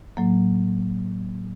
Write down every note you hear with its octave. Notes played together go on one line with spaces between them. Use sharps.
A2 F#3 A#3